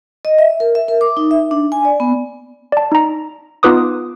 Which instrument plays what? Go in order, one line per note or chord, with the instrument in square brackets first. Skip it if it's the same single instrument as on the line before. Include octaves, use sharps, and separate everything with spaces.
[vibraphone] D#5
E5
A#4
E5
A#4
D6
D#4
E5
D4
G#5
D5
B3
[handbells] D5 A5
D#4 A#5
B3 D#4 F4 B4 D6 D#6